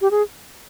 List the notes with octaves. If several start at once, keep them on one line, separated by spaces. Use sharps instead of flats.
G4
G#4